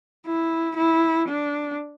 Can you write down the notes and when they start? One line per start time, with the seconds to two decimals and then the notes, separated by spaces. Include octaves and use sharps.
0.26 E4
0.77 E4
1.28 D4